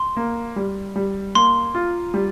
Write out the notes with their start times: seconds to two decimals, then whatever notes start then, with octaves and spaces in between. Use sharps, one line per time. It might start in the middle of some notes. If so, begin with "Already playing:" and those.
Already playing: C6
0.17 A#3
0.56 G3
0.96 G3
1.35 A#3 C6
1.75 F4
2.14 G3